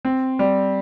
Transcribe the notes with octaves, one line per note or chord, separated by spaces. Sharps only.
C4
G3